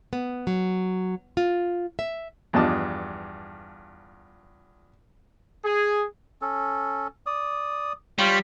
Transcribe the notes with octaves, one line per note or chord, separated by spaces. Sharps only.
B3
F#3
F4
E5
E2 G2 F3 D#5 A5 D6
G#4
C#4 A4
D5 D#6
G3 F4 C#5 G5